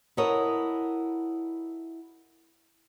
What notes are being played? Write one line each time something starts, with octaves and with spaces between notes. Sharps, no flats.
E4 F#4 A4 A#4 C#5 D#5